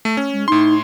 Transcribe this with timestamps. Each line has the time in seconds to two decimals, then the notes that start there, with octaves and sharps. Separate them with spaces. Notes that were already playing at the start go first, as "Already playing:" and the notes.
0.05 A3
0.17 C#4
0.32 G#3
0.48 A2 D#4 C6